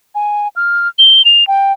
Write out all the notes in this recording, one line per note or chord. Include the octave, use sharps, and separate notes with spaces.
G#5
F6
G7
F7
G5